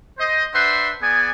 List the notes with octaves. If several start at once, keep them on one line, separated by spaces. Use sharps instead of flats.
C5 D#5
D4 B4 C5 E5 F#5 C6
B3 G#4 D5 G#5